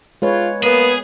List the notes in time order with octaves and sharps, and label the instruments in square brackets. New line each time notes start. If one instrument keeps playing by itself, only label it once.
[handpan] G#3 B4 C#5 [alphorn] F4
[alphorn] A#3 [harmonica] B3 [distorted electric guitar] G#4